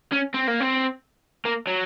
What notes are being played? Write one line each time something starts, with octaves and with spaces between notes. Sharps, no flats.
C#4
C4
A#3
C4
A#3
F#3